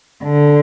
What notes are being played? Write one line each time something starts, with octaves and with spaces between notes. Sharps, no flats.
D3